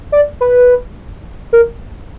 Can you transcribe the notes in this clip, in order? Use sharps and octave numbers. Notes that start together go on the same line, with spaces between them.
D5
B4
A#4